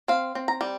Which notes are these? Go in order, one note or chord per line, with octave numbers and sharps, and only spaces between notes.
C4 F5
C4
A#5
G3